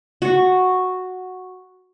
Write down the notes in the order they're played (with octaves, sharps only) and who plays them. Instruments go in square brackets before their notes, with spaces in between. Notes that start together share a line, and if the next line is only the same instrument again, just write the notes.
[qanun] F#4 C#6